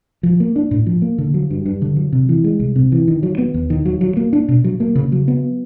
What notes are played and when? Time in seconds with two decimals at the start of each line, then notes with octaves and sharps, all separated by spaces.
0.23 F3
0.40 A#3
0.56 D4
0.71 A2
0.86 F3
1.02 A#3
1.18 D3
1.34 F#3
1.50 G2
1.66 G2
1.82 D3
1.96 F#3
2.12 C3
2.29 E3
2.44 G#3
2.59 C2
2.76 C3
2.92 E3
3.08 D#3
3.23 F#3
3.38 B3
3.54 D#2
3.70 D#3
3.85 F#3
4.01 F#3
4.17 A#3
4.33 D4
4.48 B2
4.64 F#3
4.80 A#3
4.95 C#3
5.12 F#3
5.28 B3